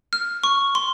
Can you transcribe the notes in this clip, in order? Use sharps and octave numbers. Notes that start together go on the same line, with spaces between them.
F6
C#6
C6